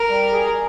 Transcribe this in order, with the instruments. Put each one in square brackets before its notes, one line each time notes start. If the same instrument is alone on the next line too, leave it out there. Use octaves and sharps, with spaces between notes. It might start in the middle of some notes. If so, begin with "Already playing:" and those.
Already playing: [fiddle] A#4
[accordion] G3
G#4